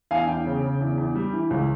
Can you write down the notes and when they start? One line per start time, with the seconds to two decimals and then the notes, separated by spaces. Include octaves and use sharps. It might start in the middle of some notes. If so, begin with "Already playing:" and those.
0.11 E2 F5 G#5
0.28 E2 G5
0.46 C#3
0.63 C#3
0.80 E2
0.98 E2
1.15 G3
1.33 E3
1.50 C#2